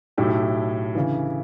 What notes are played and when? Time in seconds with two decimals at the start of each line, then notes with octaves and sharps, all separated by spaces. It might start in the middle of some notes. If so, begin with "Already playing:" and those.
0.17 B1 A2 F#3 E4 G4
0.95 D2 C#3 E3